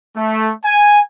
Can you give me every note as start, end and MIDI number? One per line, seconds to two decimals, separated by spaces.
0.16 0.51 57
0.65 0.99 80